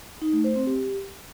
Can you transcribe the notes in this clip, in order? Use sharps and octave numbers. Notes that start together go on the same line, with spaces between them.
D#4
A3
C5
C4
G4